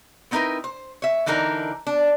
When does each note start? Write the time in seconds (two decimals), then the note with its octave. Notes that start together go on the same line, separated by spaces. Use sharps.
0.31 B3 C4 D#4 E4 A#4 B4
0.64 C5
1.02 C#5 E5
1.26 D3 E3 D4 D#4 A#4
1.87 D4